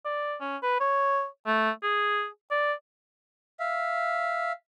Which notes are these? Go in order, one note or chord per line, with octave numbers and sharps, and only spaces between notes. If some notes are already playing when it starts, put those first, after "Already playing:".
D5
C#4
B4
C#5
A3
G#4
D5
E5 F5